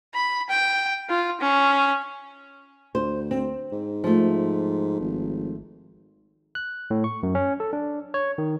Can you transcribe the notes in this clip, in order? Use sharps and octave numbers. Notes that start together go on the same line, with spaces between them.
B5
G5
F4
C#4
D2 C5
C4
G#2
F3 A3
G#1
F#6
A2
C#6
F#2
C#4
A4
D4
C#5
D#3